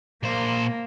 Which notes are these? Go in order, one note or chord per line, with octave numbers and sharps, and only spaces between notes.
A#2 A#3 C5